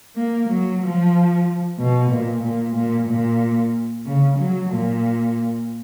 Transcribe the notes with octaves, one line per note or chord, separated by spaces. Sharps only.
A#3
F#3
F3
B2
A#2
A#2
A#2
A#2
C#3
F#3
A#2